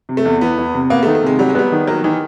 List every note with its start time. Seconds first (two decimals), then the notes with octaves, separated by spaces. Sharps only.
0.09 C3
0.17 A3
0.25 E2
0.41 E3 B3
0.58 E2
0.74 C3
0.90 A#3 B3
1.03 A3
1.06 D#3
1.15 A3
1.23 C3 G#3
1.39 F#3 G3
1.49 G#3
1.55 G3 B3
1.72 D#3
1.87 F#3 A#3
2.04 D#3 E3